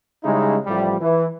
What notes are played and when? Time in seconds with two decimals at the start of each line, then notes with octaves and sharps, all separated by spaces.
0.23 C#3 G3 G#3 C#4 D#4 E4
0.65 A1 A2 F3 G3
1.00 E3 B4